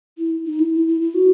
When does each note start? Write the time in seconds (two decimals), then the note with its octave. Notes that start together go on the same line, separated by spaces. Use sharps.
0.18 E4
0.45 D#4
0.59 E4
0.74 E4
0.87 E4
1.01 E4
1.14 F#4